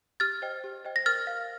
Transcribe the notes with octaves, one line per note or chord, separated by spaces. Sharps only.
G4 F6 A6
C5 D#5 G5
G4
C5 D#5 G5
A#6
A#4 F6 A6
F5